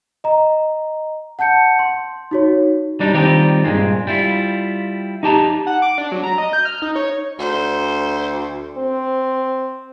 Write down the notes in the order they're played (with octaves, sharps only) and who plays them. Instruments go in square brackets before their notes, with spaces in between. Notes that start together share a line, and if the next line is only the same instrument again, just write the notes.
[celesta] D#5 A#5
F#5 A5 G6 C#7
C6
D#4 F#4 C#5
[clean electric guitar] G3 D4 D#4
D#3 G3 C4 D#4 F4 G4
G2 A#2 G#3 C4
G3 E4 F4
D#4 G4 A5 A#5
[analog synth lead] F#5
D6
D4
F#3
A#5
D#5
G6
F6
D#4
C#5
[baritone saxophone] D2 [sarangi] C5
[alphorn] C4